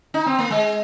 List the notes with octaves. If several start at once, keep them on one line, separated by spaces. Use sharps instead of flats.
D#4
C4
A#3
G#3